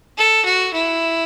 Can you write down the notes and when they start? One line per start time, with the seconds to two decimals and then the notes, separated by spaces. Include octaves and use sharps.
0.18 A4
0.45 F#4
0.74 E4